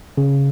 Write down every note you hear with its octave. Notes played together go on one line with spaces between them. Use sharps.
C#3